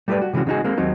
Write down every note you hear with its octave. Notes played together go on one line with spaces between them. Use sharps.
G3 A3 G4 A4 B4 D5
F#4
C3 E3 G#3 C#4 F#4
C#3 G#3 D#4 F#4 G#4
G#3 A#3 C4
D#2 F#3 C4 D#4